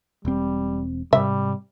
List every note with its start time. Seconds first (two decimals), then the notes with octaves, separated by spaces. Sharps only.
0.25 E1 G3 C4
1.13 G#2 C3 G3 E5